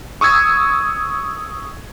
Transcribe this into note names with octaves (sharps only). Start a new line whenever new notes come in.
C#6 D#6 E6 G#6